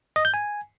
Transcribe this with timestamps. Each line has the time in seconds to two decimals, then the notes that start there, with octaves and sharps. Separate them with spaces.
0.16 D#5
0.25 G6
0.34 G#5